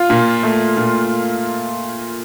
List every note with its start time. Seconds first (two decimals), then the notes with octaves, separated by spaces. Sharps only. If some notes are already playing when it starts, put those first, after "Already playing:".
Already playing: F4
0.10 A#2
0.43 A3
0.77 A#2